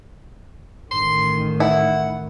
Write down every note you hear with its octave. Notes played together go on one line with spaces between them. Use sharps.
A1 D#3 C6
E4 F#5